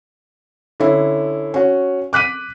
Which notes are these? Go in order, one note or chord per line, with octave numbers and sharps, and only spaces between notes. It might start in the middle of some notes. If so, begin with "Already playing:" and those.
D3 C#4 E4
C#4 F#4
D6 F#6 B6 D#7